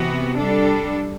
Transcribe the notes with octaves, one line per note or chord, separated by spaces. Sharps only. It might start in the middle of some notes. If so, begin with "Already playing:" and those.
Already playing: C3 E3 B3 F#4
G3 D4 A4